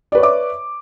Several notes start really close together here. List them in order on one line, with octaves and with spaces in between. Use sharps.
D5 B4 C#5 E5 D6